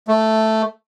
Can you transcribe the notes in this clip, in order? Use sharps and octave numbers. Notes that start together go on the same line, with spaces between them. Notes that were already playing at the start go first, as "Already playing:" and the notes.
A3